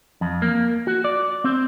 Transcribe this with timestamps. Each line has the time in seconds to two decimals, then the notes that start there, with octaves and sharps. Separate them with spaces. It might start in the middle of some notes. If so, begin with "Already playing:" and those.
0.21 F2
0.42 A#3
0.87 F#4
1.04 D5
1.44 C4